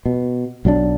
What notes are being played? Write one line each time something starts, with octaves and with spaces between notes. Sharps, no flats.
B2
B1 F#3 G3 D4